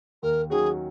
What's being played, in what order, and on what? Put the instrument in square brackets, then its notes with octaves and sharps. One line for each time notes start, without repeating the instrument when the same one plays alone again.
[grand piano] D#2 [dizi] A#4
[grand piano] D#3 F#3 C#4 F#4 [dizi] G#4